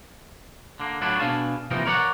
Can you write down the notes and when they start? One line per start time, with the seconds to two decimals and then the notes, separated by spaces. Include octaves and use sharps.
0.80 D3 A#3
1.01 A2 F#3 D4 E4 F4
1.19 B2 D4 G#4 F5 G#5 A5
1.71 C3 E3 F3 A#3 D#4 A#4
1.86 A#4 C#5 D5 F5 F#5